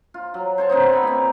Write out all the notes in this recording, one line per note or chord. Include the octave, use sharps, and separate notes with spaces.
F4
F#3
C5 C#5 A5
B2 D3 C4 D#4
C#5 B5
A#2 C4